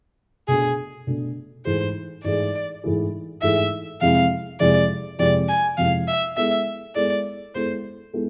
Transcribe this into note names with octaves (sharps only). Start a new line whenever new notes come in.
B2 A3 D4 G#4
B2 A3 D4
G#2 E3 A3 E4 G#4 C5
G#2 E3 A3 E4 G#4 D5
G#2 E3 A3 E4 G#4
G#2 E3 A3 E4 G#4 E5
F2 C3 G#3 C4 E4 F5
F2 C3 G#3 C4 E4 D5
F2 C3 G#3 C4 E4 D5
G#5
F2 C3 G#3 C4 E4 F5
E5
G#3 B3 E4 A4 E5
G#3 B3 E4 A4 D5
G#3 B3 E4 A4 C5
G#3 B3 E4 A4